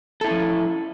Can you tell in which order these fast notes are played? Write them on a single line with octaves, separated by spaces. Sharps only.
A4 E4 C#4 F3